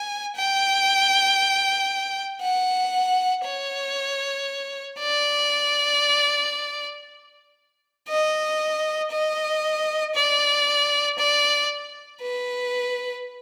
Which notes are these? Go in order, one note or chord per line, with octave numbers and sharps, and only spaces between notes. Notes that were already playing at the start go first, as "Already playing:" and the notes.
Already playing: G#5
G5
F#5
C#5
D5
D#5
D#5
D5
D5
B4